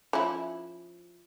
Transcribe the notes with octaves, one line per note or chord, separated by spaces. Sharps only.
F3 C#4 E4